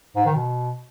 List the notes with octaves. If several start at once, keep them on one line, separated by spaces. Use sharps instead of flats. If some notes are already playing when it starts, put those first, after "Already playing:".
G#2
D#3
B2